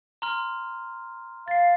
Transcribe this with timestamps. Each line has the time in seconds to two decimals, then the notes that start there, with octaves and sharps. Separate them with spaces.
0.22 A#5 C6 F6
1.48 F5 A6 C7